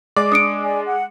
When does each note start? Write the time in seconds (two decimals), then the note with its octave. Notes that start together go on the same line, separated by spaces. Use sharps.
0.16 G#3 D5 D6
0.32 D4 D#6 C#7 D7
0.63 D5 G#5
0.85 F#5